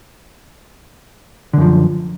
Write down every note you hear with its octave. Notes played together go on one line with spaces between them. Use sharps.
F#2 D3 F3